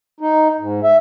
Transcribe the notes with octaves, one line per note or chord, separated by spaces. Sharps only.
D#4
G#2
E5